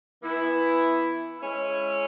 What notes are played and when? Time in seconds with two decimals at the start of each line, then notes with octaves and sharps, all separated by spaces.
0.22 E3 B3 E4
1.38 G#3 C#4 E4